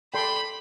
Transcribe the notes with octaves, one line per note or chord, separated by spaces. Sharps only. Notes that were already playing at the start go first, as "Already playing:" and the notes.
A4 D5 G5 B5 C6